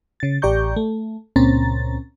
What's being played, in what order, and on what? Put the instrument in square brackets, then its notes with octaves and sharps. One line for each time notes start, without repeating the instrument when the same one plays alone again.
[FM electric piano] C#3 A6
A1 G4 D5 A#5 C#6 G6
A3
C#2 A#2 C4 C#4 A#5 A6